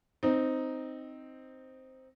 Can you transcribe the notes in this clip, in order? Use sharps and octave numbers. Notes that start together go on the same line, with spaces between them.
C4 D#4